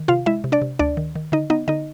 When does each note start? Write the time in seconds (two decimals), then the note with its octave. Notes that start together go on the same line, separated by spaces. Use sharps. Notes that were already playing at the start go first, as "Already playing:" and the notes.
Already playing: D#3
0.08 C3 F4 F5
0.26 G#3 E4 E5
0.44 C3
0.52 D4 D5
0.62 C3
0.79 D2 D4 D5
0.97 D#3
1.16 D#3
1.32 D3 D#4 D#5
1.50 B3 D#4 D#5
1.68 D3 D#4 D#5